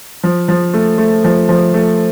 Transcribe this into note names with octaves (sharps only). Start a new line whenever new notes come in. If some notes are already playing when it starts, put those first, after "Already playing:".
F3
F3
A3
A3
F3
F3
A3